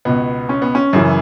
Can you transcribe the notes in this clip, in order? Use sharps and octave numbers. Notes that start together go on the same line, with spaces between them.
C#2 B2 B3
C#4
B3
C#4
F#2 C#3 E3